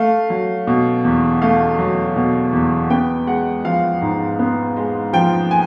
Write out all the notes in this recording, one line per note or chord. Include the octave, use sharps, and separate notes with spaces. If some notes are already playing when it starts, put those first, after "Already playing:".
Already playing: A3 F5
F#3
B2
E2
A3 F5
F#3
B2
E2
B3 G5
G#3 F#5
F3 F5
G#2
B3
G#3
F3 G5
G#5